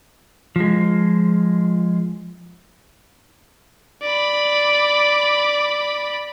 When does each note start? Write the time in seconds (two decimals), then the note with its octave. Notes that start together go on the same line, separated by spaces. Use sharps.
0.56 F3 G#3
4.02 D5 B5